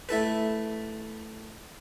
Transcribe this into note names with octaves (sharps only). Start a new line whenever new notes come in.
A3 E4 A4 B4